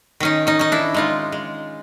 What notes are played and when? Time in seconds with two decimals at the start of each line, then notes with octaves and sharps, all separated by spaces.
0.20 D#3 C#4 D#4
0.47 C#4 D#4
0.59 C#4 D#4
0.72 D4 E4
0.94 G#3 D#4 F4
1.32 G#3